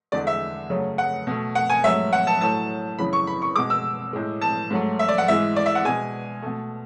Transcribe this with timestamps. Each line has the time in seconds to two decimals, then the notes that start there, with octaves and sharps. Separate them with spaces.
0.12 E2 D3 G#3 D5
0.27 E5
0.69 F#2 C#3 F#3 A3
0.98 F#5
1.27 B2 A3
1.55 F#5
1.70 G#5
1.84 G#2 F#3 A3 E5
2.13 F#5
2.27 A5
2.41 A2 F#3 A3 A5
2.98 F#2 C#3 E3 B5
3.13 C#6
3.27 B5
3.42 C#6
3.56 B2 G#3 D6
3.70 E6
4.13 A2 G#3
4.41 A5
4.70 G#2 F#3 A3
4.99 E5
5.08 D5
5.18 F#5
5.28 G#2 E3 G#3 E5
5.56 D5
5.66 E5
5.75 F#5
5.85 B2 G#3 G#5
6.42 B2 A3